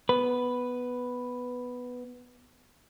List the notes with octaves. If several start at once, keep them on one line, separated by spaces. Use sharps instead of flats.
B3 B4